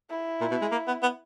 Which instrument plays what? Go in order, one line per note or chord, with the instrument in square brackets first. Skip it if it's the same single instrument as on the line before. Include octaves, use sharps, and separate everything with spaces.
[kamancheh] E4
[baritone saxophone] A#2
B2
G#3
A#3
B3
B3